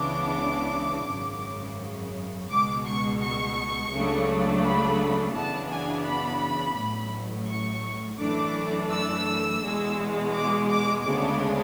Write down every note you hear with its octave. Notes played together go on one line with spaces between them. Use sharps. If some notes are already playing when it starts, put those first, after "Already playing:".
Already playing: C#2 C#3 E3 B3 D4 D6
G#1 F#2 C#3
C#2 B2 G#3 D6
C#6
C#6
C#2 C#3 F#3 A3 D4
B5
F#2 C#3 E3 B3 D4 A5
G#5
B5
A1 A2 F#3
C#6
F#2 E3 A3 D4 D6
E6
E2 B2 G#3
D6
D6
D2 C#3 G#3 B3 D4 D6